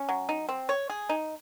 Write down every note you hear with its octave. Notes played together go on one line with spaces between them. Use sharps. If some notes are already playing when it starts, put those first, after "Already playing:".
Already playing: C#4
F#3
D#4
C4
C#5
G#4
D#4